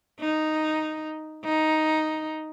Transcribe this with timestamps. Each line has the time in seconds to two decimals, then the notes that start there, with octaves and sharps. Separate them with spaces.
0.20 D#4
1.45 D#4